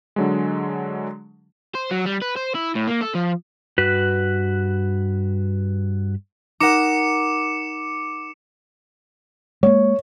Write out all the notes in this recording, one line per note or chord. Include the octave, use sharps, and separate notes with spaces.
D3 F#3 G#3
C5
F#3
G3
B4
C5
E4
A2
A#3
A4
F3
G2 F#4 B4
D#4 A#4 F#5 D6 C#7 E7
G#3 A#3 C#5